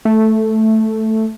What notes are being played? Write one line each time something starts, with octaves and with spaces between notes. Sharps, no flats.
A3